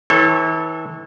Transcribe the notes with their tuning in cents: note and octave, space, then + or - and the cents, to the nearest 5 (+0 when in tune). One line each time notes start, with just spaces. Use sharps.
E3 -35 A4 +0 C#5 -35